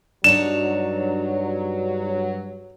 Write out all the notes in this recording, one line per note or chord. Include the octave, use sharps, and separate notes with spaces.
G2 F#3 D4 D#4 C#5 E7